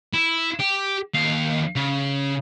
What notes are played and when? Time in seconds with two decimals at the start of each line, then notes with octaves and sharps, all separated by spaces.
0.14 E4
0.60 G4
1.14 D#2 F5
1.76 C#3